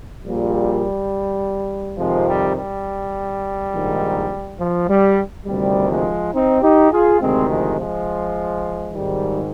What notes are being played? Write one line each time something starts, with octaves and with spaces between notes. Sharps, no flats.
A#1 A#2 G3
F2 C3 D#3 F3 G#3
G3
G3
A#1 G#2 D#3
F3
G3
D2 C3 D#3 G3
F3 G#3
C4 D#4
D#4 G4
F4 G#4
D2 C3 D#3 G#3 C4
F3 G#3
F3 G#3
G#1 G#2 D#3 G3